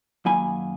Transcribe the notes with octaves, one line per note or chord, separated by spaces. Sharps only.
F#2 D#3 F#3 A#3 G#5 B5